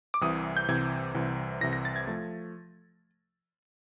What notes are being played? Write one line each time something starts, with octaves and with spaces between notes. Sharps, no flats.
D6
C2 C3 E3 D#6
G6
C2 C3 E3 G#6
C2 C3 E3
C2 C3 E3 A#6
A#6
A6
G#6
F3 A3